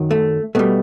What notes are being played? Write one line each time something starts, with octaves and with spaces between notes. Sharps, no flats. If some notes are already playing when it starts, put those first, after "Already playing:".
Already playing: F#2 D#3 F#3
A3
B2 G3 A3